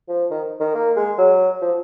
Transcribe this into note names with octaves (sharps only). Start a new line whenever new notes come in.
F3
D#3
D#3
A#3
G#3
F#3
F3